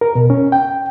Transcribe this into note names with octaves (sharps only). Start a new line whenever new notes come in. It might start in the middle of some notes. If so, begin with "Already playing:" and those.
A#4
B2
C#4
G5